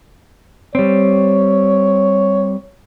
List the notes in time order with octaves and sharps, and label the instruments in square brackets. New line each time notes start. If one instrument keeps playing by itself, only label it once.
[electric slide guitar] G3 C4 [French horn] C#5